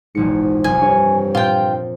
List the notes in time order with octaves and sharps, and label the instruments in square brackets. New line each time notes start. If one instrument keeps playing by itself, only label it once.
[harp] E1 A#1 C#7 [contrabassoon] G#2
[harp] C2 F2 [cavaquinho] G#5
[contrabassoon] G2 [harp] C#5
[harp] A#2 [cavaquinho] F4 G5